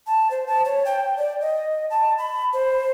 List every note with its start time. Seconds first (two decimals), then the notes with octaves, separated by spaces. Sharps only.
0.07 A5
0.31 C5
0.47 A5
0.65 C#5
0.85 G5
1.17 D5
1.41 D#5
1.90 A5
2.18 B5
2.53 C5